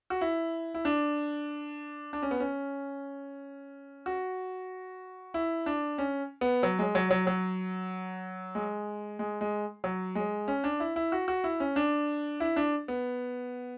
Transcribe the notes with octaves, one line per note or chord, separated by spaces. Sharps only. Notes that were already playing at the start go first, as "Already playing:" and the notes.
F#4
E4
E4
D4
D4
C#4
B3
C#4
F#4
E4
D4
C#4
B3
F#3
G#3
F#3
F#3
F#3
G#3
G#3
G#3
F#3
G#3
C#4
D4
E4
E4
F#4
F#4
E4
C#4
D4
E4
D4
B3